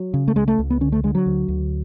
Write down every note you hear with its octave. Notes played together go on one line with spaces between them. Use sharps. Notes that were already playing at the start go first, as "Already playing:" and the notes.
Already playing: F#3
C#3
A3
C#2 G#3
A3
C#2
B3
D3 C#4
A3
D3 G#3
F#3
D2
D2